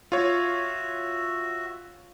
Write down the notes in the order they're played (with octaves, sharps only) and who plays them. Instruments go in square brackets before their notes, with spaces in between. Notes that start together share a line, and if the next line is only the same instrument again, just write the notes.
[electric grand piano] F4 C#5 [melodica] F#4 E5